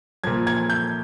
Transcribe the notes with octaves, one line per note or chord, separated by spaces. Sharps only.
A#2 F3 G#6
G#6
G6